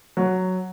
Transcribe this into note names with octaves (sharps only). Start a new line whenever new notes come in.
F#3